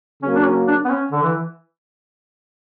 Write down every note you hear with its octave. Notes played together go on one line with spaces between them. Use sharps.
C#3 F#3 A#3 C#4
D4
C#4
D4
B3
C#4
D3
E3